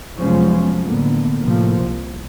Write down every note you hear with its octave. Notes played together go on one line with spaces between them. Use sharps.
F1 F3 F#3 G#3 B3 C#4
A2 D3 A#3 B3
A2 C3 F3 A#3
C2